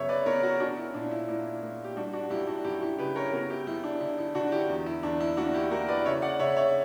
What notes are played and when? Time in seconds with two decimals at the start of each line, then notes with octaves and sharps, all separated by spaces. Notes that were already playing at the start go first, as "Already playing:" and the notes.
Already playing: F#2 C#3 B3 C#5 E5
0.09 B4 D5
0.26 B3 A#4 C#5
0.43 F#4 A#4
0.60 C#4 D4 F#4
0.77 E4
0.94 A#2 D4
1.11 E4
1.28 A#3 E4
1.63 A#3
1.84 G4
1.96 G3 D4 F#4
2.13 D4 F#4
2.30 F#2 E4 G4
2.47 D4 F#4
2.64 F#2 E4 G4
2.82 E4 G4
2.98 C#3 G4 B4
3.16 A#4 C#5
3.33 B3 F#4 A#4
3.50 E4 G4
3.67 F#2 E4
3.84 D4
4.01 D3 E4
4.18 E4
4.35 D3 D4 F#4
4.52 E4 G4
4.69 E2
4.86 E4
5.03 E2 D4
5.20 E4
5.37 A#3 D4 F#4
5.54 E4 G4
5.71 A#3 F#4 A#4
5.88 B4 D5
6.05 C#3 C#5 E5
6.22 D5 F#5
6.39 C#3 C#5 E5
6.57 C#5 E5